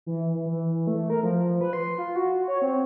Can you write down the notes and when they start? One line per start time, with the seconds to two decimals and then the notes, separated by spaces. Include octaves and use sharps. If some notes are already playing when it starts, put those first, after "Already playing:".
0.06 E3
0.46 E3
0.87 A3
1.10 A#4
1.23 F3
1.61 B4
1.73 C6
1.98 F4
2.16 F#4
2.48 C#5
2.62 C4